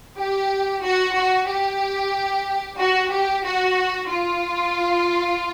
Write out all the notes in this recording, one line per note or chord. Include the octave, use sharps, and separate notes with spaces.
G4
F#4
F#4
G4
F#4
G4
F#4
F4